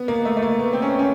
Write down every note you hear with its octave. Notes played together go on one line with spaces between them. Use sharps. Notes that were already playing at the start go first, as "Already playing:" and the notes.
Already playing: B3
A#3
A3
A3
A#3
B3
C4
C#4
C#4